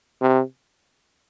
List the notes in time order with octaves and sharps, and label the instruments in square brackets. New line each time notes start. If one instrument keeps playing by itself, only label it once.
[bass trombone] C3